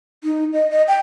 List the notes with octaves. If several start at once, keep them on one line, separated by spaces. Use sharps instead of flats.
D#4
D#5
D#5
G5